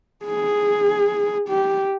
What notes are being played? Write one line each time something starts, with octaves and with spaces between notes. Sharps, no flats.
G#4
G4